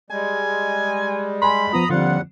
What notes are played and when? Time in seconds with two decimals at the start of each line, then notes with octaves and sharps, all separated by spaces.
0.10 G3 G#3 G#5
1.42 G#5 B5 C6
1.73 F3 B3 F4 A#5 D#6
1.90 D#2 D3 F3 G3 C4 F4 F#5